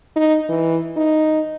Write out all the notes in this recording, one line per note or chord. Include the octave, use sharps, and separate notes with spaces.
D#4
E3
D#4